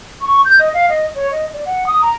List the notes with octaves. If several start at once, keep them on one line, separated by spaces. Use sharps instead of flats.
C#6
G6
D#5
F5
D#5
C#5
D#5
D5
F#5
D#6
A#5